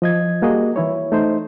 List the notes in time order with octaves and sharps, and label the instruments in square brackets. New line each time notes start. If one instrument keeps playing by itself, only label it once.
[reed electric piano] F3 D#5 G#6
G3 A#3 F#4 G#4 D#5
E3 E4 C#5
A3 D#4 C5